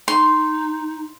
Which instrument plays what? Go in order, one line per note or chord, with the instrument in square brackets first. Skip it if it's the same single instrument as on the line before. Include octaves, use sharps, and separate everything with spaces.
[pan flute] D#4 [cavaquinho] C6